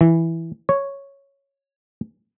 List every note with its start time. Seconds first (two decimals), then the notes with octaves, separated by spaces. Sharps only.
0.01 E3
0.69 C#5